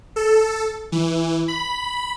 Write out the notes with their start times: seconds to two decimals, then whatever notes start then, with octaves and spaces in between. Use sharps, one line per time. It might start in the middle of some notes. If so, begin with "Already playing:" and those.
0.16 A4
0.92 E3
1.48 B5